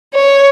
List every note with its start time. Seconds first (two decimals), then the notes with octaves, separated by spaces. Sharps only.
0.14 C#5